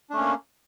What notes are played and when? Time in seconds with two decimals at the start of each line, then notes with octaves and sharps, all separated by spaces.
0.10 D4
0.13 A3
0.17 C#4
0.20 A#3